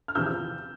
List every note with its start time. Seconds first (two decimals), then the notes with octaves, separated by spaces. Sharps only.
0.08 F6
0.15 E2 C3 F3 E6 G6